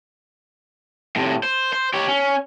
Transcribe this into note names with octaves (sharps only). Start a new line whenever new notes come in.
A2 C3
C5
C5
G4 C#5
C#4